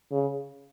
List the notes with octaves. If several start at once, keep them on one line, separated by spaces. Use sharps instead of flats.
C#3